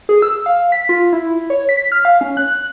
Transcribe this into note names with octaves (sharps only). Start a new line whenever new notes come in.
G#4
E6
F5
B6
F4
E4
C#5
B6
F6
F5
C#4
F#6